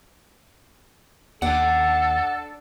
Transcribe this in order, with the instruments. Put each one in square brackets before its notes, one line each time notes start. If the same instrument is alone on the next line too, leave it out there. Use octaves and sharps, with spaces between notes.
[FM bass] D#2 [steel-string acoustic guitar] D4 [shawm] A4 [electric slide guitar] D5 F#5